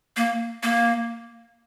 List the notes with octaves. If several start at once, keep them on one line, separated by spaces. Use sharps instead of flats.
A#3
A#3